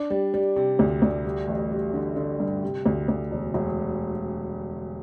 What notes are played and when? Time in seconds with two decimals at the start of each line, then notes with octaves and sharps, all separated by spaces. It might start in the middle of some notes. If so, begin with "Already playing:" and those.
Already playing: D4
0.10 G3
0.34 G3
0.56 C3
0.79 D2
1.02 D2
1.25 G3
1.48 A1
1.71 G3
1.94 D3
2.16 D3
2.40 G2
2.63 C3
2.86 D2
3.08 D2
3.31 E1
3.54 E1